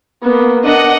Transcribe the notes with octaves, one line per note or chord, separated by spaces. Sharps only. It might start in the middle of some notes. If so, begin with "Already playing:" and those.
A#3 B3
D4 A#4 D#5 F#5